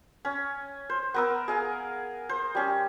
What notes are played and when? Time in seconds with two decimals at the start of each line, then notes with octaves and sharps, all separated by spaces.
0.25 C#4
0.90 C5
1.14 B3 A#4 E6
1.48 G#4 F5 G#5
2.29 C5
2.55 G3 C#4